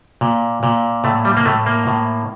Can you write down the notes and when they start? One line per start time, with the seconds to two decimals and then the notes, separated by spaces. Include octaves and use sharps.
0.21 A#2
0.63 A#2
1.04 A2 A3
1.25 G3
1.37 A#3
1.45 A2 A3
1.66 A#3
1.87 A2